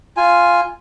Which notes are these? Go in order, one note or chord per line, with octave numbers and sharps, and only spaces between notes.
F4 G#5